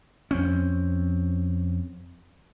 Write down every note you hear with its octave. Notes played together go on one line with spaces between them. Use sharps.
F2 C4 C#4